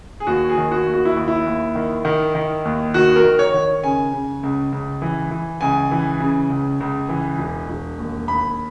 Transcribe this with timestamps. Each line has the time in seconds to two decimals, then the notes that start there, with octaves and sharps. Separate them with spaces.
0.20 G#4
0.27 D#2 F#4
0.50 G#4
0.58 D#3
0.72 F#4
0.87 D#2
0.94 F#4
1.05 E4
1.16 D#2
1.28 E4
1.46 D#2
1.75 D#3
2.05 D#3
2.35 D#3
2.65 D#2
2.94 D#3 F#4
3.16 A#4
3.24 D#3
3.39 C#5
3.54 D#3
3.83 C#3 G#5
4.13 C#3
4.43 C#2
4.72 C#2
5.02 E3
5.31 E3
5.61 C#2 G#5
5.91 E3
6.20 C#3
6.50 C#2
6.80 C#2
7.09 E3
7.39 E1
7.69 E1
7.99 D#2
8.28 D#2 B5